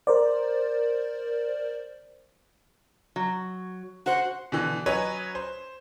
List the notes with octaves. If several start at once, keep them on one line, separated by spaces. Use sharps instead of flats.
A#4 C5 D5
F#3
F#4 C5 F#5
B2 D3 E3
F#3 C#4 B4 C#5 D#5
C5